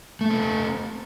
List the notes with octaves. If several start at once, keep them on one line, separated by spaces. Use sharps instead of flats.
A3 C4 A4